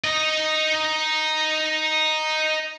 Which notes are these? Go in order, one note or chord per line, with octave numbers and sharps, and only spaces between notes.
D#4 D#5